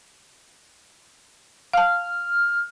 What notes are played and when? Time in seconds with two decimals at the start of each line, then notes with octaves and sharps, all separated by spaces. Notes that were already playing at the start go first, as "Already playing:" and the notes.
1.73 F5 A5 F6